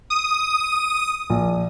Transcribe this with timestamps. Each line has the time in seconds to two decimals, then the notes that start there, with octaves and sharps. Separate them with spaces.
0.10 D#6
1.30 A#1